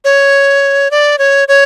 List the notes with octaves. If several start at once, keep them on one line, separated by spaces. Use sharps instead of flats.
C#5
D5
C#5
C#5